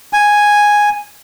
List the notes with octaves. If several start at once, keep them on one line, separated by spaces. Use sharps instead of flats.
G#5